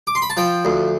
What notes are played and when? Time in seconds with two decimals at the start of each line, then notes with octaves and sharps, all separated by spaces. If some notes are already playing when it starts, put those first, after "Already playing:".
0.07 D6
0.15 C6
0.22 B5
0.30 A5
0.37 F3 G5
0.65 D2